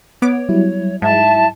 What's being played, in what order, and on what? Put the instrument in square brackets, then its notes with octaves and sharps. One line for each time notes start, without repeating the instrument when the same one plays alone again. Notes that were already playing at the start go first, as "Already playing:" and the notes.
[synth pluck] B3 D6 [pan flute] C#5
[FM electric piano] F#3 G3 E4
[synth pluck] G#2 [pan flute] E5 [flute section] A5